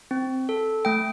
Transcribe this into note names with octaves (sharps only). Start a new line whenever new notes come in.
C4
A4
A3 G5